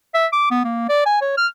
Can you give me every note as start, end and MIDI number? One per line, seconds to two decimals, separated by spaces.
0.14 0.27 76
0.33 0.48 86
0.51 0.62 59
0.65 0.89 58
0.89 1.04 74
1.06 1.18 80
1.21 1.37 73
1.37 1.47 89